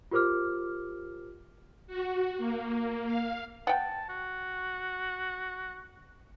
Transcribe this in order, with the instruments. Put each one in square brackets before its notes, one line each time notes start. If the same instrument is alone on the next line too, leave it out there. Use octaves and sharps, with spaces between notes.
[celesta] F4 G4 A#4 C5 D6 F6
[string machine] F#4
A#3
F5
[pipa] F#5 G5 [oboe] A5
[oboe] F#4